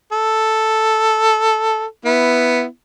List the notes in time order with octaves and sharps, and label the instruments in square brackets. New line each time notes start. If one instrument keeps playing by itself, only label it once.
[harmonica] A4
B3 E4